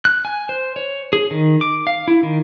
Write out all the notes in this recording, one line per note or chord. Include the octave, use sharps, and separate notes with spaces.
F#6
G#5
C5
C#5
G#4
D#3
D6
F5
E4
D#3